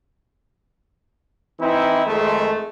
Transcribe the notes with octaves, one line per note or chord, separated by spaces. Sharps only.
E3 C4 D#4 E4
F2 D#3 G#3 A3